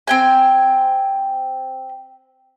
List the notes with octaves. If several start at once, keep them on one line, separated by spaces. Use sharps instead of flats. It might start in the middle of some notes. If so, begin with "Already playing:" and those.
C4 G5 G#5